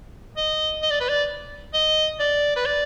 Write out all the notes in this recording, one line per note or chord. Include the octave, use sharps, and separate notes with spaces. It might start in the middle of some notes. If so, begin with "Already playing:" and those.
D#5
D#5
D5
B4
D5
D#5
D5
B4
D5